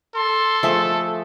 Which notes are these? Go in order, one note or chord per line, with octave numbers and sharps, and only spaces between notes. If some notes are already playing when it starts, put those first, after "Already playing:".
A4 C6
F3 A3 G#4 E5 A5